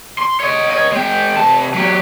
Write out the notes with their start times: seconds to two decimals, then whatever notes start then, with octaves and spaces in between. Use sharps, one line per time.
0.18 C6
0.40 C#5 D#5
0.70 C#5 D#5
0.92 G#3 G5
1.36 C3 A5
1.74 F#3 G4